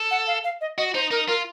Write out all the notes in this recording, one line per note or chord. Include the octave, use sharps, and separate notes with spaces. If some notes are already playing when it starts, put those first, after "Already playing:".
Already playing: A4
F#5
F5
F5
D#5
F#4 D#5
D#4 C5
D#4 A#4
F4 A#4